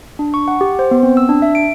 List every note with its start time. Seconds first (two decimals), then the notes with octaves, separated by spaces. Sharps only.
0.19 D4
0.34 C#6
0.48 F#5
0.61 G4
0.79 C5
0.91 B3
1.03 C4
1.17 E6
1.29 D4
1.42 E5
1.55 D7